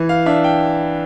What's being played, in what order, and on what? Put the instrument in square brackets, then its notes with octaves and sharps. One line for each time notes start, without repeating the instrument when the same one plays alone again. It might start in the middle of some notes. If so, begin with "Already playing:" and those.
Already playing: [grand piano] E3
F5
D4 E5
G5